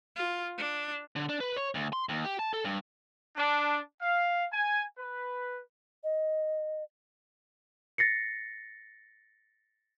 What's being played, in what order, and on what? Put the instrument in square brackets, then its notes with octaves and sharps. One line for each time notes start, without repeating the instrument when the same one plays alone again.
[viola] F4
D4
[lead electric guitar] D3
D4
B4
C#5
D2
C6
D#2
G4
A5
A4
G2
[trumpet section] D4
F5
G#5
B4
[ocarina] D#5
[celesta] A6 A#6 C7 C#7